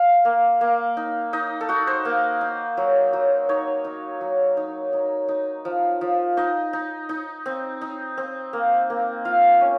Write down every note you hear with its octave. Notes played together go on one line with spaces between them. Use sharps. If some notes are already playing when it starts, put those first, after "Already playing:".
Already playing: F5
A#3
A#3
D#4
D#4 D#5
A4
D#4 F#4
C5
A#3
D#4
F#3
F#3
D#4 C#5
D#4
F#3
D#4
D#4
D#4
F3
F3
D#4 D#5
D#4
D#4
C4
D#4
C4
A#3
A#3
F4 F5
C#4